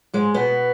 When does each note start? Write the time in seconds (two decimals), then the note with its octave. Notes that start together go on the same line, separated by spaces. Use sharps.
0.13 G#2 G#3
0.34 B2 B3